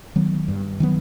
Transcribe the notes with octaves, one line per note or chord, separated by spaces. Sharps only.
D#3 F#3 B3
G2
D#3 F#3 B3